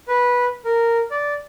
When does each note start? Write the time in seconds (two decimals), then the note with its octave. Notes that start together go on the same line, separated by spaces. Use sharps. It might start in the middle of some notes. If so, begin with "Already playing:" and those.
0.08 B4
0.65 A#4
1.11 D5